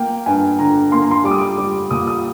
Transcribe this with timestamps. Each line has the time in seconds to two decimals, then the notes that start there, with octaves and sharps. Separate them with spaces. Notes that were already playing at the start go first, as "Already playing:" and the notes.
Already playing: A#3 G5
0.26 G2 G#5
0.59 D3 A#5
0.92 A#3 C6
1.02 A#5
1.11 C6
1.24 G3 D6
1.31 D#6
1.38 D6
1.58 G3
1.91 A#2 D#6
2.07 D#6